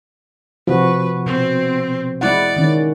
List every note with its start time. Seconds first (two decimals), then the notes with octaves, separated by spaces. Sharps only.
0.67 C3 F3 F#4 B4
1.26 B2 C4
2.21 G#3 E4 D5 F#5
2.56 D#3 C#4